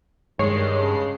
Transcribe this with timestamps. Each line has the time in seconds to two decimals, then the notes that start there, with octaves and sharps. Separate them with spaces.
0.39 G2 D#3 G#3 C#5 C7
0.81 C#3